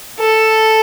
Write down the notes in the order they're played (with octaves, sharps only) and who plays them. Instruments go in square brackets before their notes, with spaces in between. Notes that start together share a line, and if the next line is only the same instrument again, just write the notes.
[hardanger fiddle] A4